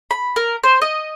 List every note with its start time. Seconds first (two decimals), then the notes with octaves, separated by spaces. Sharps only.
0.11 B5
0.36 A#4
0.63 C5
0.81 D#5